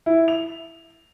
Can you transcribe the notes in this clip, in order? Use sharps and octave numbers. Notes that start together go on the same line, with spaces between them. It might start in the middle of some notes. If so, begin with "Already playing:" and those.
E4
F7